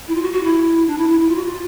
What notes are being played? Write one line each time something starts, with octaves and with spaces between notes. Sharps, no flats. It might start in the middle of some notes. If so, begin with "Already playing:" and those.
E4
F4
F#4
F#4
E4
D4
E4
E4
E4
F4
F#4
F4